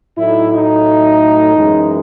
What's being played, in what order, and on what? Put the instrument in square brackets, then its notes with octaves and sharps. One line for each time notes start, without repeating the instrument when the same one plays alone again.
[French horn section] A2 F#3 A3 D#4 E4
D#4
F#2 E3 G#3